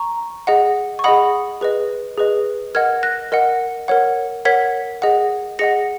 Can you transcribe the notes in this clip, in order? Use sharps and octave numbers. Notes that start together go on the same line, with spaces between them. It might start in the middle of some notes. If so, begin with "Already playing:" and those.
Already playing: A#5 C#6
G#4 D#5 F#5
C#6
G#4 D#5 F#5 B5 D#6
G#4 B4 D#5
G#4 B4 D#5
A#4 D#5 F#5 F6 G#6
F#6 A#6
A#4 D#5 F#5
A#4 C#5 F#5
A#4 C#5 F#5 G#6 B6
G#4 D#5 F#5
G#4 D#5 F#5 A#6 C#7